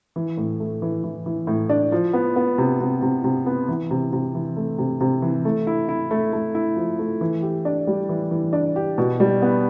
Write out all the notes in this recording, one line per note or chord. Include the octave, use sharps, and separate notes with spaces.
E3
A2
A3
E3
E3
E3
A2
D4
F3
B3
B3
C3
C3
C3
C3
B3
E3
C3
C3
E3
A3
C3
C3
E3
A3
E4
E4
A3
A3
E4
F3
A3
E3
G4
D4
G3
E3
E3
D4
G4
B2
G3
B3